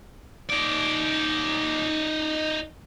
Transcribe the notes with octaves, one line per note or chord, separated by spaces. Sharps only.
D#4 D5